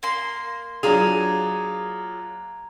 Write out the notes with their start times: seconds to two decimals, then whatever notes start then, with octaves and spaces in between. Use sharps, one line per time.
0.03 A#3 C6
0.83 F#3 D4 F4 G#4 A#5 G#6 F7